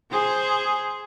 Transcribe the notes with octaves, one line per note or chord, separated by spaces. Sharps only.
G#4 C5